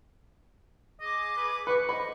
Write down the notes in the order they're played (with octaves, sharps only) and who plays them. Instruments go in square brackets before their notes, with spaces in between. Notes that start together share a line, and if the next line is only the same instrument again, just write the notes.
[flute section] G#4 D6 [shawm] D#5
[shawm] B4
[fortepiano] B4 [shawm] C#6
[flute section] C5 D#5 [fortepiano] B5